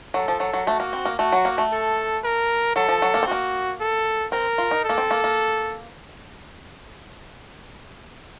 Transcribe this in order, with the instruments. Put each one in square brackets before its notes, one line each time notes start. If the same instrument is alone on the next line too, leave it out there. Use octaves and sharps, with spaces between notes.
[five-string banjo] F#3 [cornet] A4
[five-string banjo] F3
F#3
F#3
[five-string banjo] A3 [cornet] F#4
[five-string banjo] A#3
C4
A#3
[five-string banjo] A3 [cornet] F#4
[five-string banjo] F#3
A#3
A3
[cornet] A4
A#4
[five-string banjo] F#3 [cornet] A4
[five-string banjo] F3
F#3
A#3
C4
[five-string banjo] A#3 [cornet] F#4
[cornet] A4
[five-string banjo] C4 [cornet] A#4
[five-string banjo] F4
D#4
[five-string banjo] A#3 [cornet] A4
[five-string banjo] C4
A#3
A#3